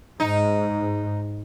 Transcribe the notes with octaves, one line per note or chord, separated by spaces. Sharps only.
G#2 D#4